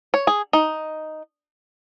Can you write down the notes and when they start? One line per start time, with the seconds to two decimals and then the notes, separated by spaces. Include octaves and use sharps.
0.14 C#5
0.27 G#4
0.53 D#4